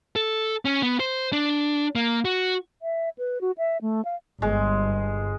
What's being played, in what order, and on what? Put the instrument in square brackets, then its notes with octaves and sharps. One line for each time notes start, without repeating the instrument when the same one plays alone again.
[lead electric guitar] A4
C#4
B3
C5
D4
A#3
F#4
[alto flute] E5
B4
F#4
E5
A3
F5
[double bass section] G1 [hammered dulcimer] G#3